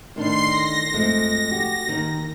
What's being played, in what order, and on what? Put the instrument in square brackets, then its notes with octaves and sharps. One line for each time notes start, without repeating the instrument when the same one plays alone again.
[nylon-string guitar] A2 D#3 D4 [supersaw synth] C6 C7
[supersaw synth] A#6
[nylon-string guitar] F2 G#3 A3
F#4 G4
D#2 D#3